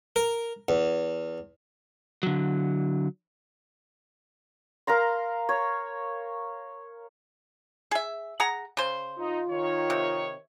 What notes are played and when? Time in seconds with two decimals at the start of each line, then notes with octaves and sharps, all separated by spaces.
0.16 A#4
0.69 E2
2.23 D3 F#3
4.87 A#4 F5 A#5 C6
5.49 C#5
7.91 G#4 E5
8.40 G#4 F#5 A#5
8.77 C#3 C5
9.19 D#4 F4
9.50 D#3 C#5
9.90 C3